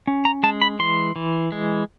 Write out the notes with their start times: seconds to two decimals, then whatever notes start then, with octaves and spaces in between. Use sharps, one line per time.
0.07 C#4
0.25 A#5
0.43 G#3 A5
0.61 B5
0.79 E3 C6
1.16 E3
1.52 G#3